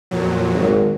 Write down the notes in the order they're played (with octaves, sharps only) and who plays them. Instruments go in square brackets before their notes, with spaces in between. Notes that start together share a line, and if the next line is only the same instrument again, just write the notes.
[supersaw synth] F2 A#2 F#3
[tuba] G#1